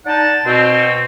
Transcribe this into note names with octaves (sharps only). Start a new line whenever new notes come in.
D4 D#4 D5 F#5 A5
B2 C4